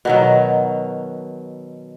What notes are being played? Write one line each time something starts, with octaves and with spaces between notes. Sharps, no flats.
B2 D#3 F#3